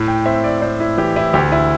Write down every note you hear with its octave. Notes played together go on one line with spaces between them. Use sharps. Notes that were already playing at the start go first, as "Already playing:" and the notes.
Already playing: A2
G5
C4 E5
D5
A2 C5
E4
E3 G4
E4
D2 G4
E4